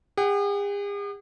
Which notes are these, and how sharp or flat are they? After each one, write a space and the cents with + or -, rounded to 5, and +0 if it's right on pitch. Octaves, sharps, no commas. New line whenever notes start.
G#4 -45 F#5 +35